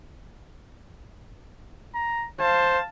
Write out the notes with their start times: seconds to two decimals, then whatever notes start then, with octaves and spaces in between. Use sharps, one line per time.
1.95 A#5
2.40 C5 F5 A5